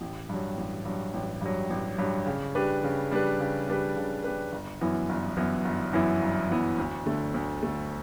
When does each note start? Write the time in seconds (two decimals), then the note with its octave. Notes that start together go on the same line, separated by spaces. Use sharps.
0.01 A1
0.29 G2 F#3
0.57 A1
0.85 G2 F#3
1.14 A1
1.42 G2 F#3
1.70 A1
1.98 G2 F#3
2.27 C#3
2.55 G3 D4 G4 B4
2.83 C#3
3.11 G3 D4 G4 B4
3.40 C#3
3.67 G3 D4 G4 B4
3.96 C#3
4.24 G3 D4 G4 B4
4.52 G1
4.81 F#2 E3 B3 E4
5.09 G1
5.37 F#2 E3 B3 E4
5.65 G1
5.93 F#2 E3 B3 E4
6.22 G1
6.49 F#2 E3 B3 E4
6.78 D2
7.06 D3 A3
7.34 D2
7.63 D3 A3